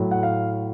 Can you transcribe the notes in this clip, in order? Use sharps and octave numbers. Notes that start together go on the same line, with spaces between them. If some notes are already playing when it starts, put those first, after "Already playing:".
Already playing: A2 F#3
F#5
F5